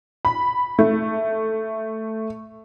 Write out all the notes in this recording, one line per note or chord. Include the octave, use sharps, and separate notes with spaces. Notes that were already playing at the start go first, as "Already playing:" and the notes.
B5
A3